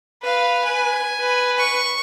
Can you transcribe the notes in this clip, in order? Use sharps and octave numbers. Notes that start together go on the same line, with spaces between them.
B4 F5
G#5
B4
C#6